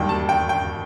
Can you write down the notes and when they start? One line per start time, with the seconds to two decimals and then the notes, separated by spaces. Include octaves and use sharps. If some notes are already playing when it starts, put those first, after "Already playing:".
Already playing: E1 D#2 D#3 G3 G5
0.09 A5
0.29 G5
0.49 G5